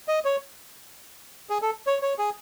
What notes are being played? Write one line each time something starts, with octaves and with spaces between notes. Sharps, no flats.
D#5
C#5
G#4
A4
C#5
C#5
G#4